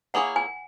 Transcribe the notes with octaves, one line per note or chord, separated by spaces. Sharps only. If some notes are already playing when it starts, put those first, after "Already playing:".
A#3 E4 G#4 C#5 F#5
G#5